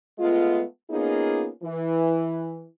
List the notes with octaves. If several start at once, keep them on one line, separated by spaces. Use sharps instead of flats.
G#3 A3 B3 F4
A#3 B3 C#4 D#4 F4 G#4
E3